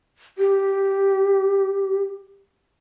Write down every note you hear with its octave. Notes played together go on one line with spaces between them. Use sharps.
G4